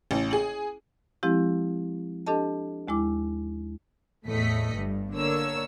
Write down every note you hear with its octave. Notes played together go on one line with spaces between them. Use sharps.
A1
G#4 F#7
F3 G#3 C4 E4 G4
D4 G4 A4 D#5 A5
D#2 G#3 E4 D6
E2 A2 A3 D#5 B6 C#7
G1 G2
D3 A#3 C#5 E6